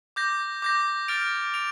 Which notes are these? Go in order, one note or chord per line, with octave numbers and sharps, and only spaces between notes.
D6 G6 A#6
D6 G6 A#6
F6 A6 D7 F7
D7 F7